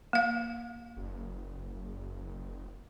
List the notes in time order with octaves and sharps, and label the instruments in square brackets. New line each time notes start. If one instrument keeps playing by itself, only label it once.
[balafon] A#3 F5
[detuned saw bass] F#1